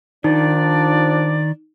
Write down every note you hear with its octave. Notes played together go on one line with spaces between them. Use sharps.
D#3 F3 D4 D#4 D5